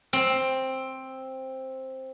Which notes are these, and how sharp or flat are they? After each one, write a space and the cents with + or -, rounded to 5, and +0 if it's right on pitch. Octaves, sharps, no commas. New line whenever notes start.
C4 +10